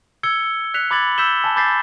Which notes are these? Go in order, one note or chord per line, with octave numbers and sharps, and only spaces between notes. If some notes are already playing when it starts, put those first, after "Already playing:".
E6 G#6 C#7 G7
F#6 B6 C#7 F7
B5 D6 G#6 A6 F#7
E6 G6 B6 E7 G7
G#5 A5
B5 D6 G6 A6 B6 C7